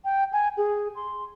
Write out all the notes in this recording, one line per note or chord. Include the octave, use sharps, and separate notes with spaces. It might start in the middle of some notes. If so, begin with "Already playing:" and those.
G5
G#5
G#4
C6